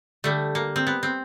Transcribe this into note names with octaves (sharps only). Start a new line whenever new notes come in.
D3 G3 A3
A#3
C4
B3
C4